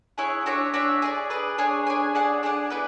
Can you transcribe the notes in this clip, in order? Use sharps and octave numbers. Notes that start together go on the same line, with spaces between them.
E4 G#4 C#5 F#5
D4 F#4 C#5 E5
D4 F#4 C#5 E5
G#4 B4 D5
G#4 B4 D5
D4 G#4 C#5 G#5
D4 G#4 C#5 G#5
D4 G#4 D5 F#5
D4 G#4 D5 F#5
B3 E4 B4 D5